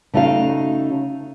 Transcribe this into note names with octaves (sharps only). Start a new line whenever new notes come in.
C#3 A3 D#4 F#4 F5